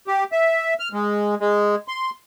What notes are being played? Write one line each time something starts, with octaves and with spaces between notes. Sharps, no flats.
G4
E5
F6
G#3
G#3
C6